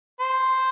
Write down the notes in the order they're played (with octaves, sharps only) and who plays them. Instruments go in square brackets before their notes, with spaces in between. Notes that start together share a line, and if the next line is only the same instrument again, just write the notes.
[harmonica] C5